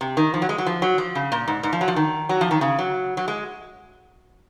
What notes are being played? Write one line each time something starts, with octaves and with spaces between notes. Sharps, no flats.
C3
D#3
F3
F#3
G#3
F#3
F3
F#3
F3
C#3
A#2
G#2
G#2
F3
F#3
F3
D#3
F#3
F3
D#3
C#3
F#3
F#3
G#3